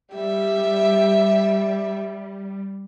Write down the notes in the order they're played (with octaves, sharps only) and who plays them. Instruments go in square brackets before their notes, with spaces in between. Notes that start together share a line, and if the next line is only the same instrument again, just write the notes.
[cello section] G3 [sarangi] G4 [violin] E5